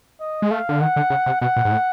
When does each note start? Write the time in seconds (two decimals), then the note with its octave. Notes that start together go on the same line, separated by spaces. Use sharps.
0.20 D#5
0.42 G#3
0.51 A3 F5
0.69 D3
0.80 D#3 F#5
0.96 D3
1.10 C#3
1.26 C3
1.41 B2 F#5
1.56 A#2
1.65 G#2
1.72 A2